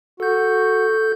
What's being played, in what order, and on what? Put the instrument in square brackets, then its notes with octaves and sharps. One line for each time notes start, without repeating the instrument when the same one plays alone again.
[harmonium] F#4 [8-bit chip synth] A4 G6